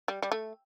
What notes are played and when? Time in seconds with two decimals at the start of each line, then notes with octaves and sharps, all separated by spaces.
0.08 G3
0.22 G3
0.32 A3